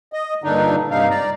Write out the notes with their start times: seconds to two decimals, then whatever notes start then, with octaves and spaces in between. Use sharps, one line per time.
0.13 D#5
0.44 G2 A#2 D3 D4 D#4
0.91 G2 C3 D#4 F5
1.10 D5 A#5